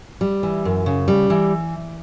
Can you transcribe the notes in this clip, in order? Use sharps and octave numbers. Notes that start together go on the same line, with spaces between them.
G3
E3
F#2
C#3
G3
E3